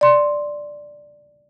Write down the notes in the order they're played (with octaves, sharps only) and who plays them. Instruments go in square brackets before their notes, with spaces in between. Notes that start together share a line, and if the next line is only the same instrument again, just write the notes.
[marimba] D5 C6